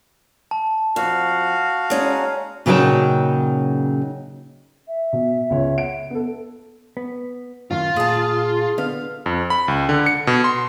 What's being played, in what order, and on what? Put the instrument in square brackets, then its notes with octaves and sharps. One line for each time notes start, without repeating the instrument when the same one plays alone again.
[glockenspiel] A5
[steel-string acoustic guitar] F2 [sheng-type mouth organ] F#4 F5
[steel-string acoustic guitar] G#3 C#4 D#4
A#2 C#3 F#3 D#4 G5 A5
[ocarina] E5
[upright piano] B2
C#2 C#5
F#5 D7
B3 A4
[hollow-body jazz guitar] B3
[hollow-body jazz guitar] F#2 A2 D#3 [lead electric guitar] F4
[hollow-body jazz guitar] A#2 [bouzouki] G#4 A5
[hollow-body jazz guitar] D3 B3 [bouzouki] F5
[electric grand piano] F2
B5
C#2
D3
C#7
B2
C6